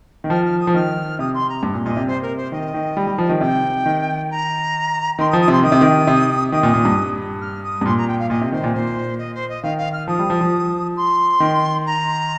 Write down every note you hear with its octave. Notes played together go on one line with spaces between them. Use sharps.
D#3
F3 F6
F6
D#6
F3
D#3 F6
C3 D#6
C6
A#5
G2
A#2
A#2 D#5
C3
C5
A#4
C5
D#3 D#5
D#3
G3
G3
F3
D#3
C3 G5
D#3
A#5
D#3 C6
D#6
F3
D#6
C3 C6
D#3 D#6
C3
D#3
C3
D#3 D#6
A#2
A#2
G2
F6
D#6
G2
A#2 C6
A#5
G5
F5
A#2 D#5
C3
D#3 C5
A#2
A#2 C5
D#5
C5
D#5
D#3 F5
F5
F6
F3 D#6
G3
F3
F3
C6
D#3
A#5